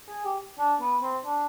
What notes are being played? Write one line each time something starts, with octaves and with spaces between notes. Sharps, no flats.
G#4
G4
D4
B3
C4
D4